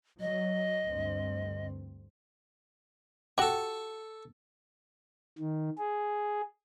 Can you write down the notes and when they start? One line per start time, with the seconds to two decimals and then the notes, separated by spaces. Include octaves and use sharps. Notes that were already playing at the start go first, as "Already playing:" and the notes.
0.20 F#3 D#5
0.85 D2 G2 C4
3.38 F#4 G4 A4 C#6
5.38 D#3
5.78 G#4